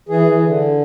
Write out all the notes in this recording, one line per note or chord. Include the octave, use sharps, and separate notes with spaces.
E3 G#4
E3
D3